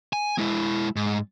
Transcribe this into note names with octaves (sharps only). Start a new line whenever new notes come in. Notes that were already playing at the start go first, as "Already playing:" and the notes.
G#5
G#3 E4
G#2